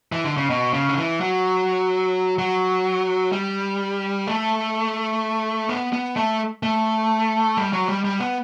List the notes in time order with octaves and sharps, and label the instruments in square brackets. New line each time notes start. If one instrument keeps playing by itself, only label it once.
[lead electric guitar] E3
D3
C#3
B2
C#3
D3
E3
F#3
F#3
G3
A3
B3
B3
A3
A3
G3
F#3
G3
G3
B3